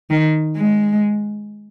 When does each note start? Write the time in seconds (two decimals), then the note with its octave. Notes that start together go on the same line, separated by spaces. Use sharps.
0.10 D#3
0.56 G#3